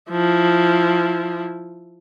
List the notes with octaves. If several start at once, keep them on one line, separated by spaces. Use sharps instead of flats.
F3 E4